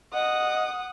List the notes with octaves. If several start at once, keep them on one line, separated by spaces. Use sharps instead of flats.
D#5 F#5 D#6